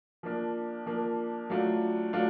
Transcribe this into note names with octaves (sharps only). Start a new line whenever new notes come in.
F3 A#3 D4
F3 A#3 D4
F#3 A3 D4 F4
F#3 A3 D4 F4